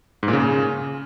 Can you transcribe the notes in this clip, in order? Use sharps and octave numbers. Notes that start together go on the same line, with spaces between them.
G#2
A#2
C#3